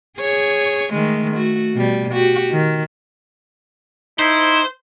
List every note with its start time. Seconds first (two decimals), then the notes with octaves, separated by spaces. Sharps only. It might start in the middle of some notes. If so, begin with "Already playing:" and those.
0.19 G#4 C#5
0.93 D#3 G#3 A3
1.34 A3 F#4
1.74 B2 G3
2.13 F#4 G4
2.51 D#3
4.19 D#4 E4 C5